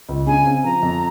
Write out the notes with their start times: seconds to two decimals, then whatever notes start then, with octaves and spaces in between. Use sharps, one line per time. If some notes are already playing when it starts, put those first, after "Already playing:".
0.09 C#2
0.27 C#3 G#5
0.46 C4
0.64 F3 A#5
0.83 F2